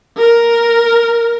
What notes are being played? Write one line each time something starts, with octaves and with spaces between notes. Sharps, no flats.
A#4